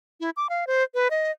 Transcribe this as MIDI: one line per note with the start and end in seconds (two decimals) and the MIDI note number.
0.20 0.30 64
0.37 0.47 86
0.50 0.67 77
0.67 0.83 72
0.94 1.08 71
1.11 1.31 75